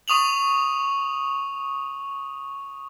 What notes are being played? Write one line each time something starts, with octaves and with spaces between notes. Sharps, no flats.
C#6 D#6 F7 F#7